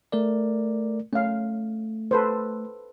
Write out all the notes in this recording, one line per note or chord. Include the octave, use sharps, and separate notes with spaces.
A3 A#4 D5
A3 C#4 F5
A4 B4 C5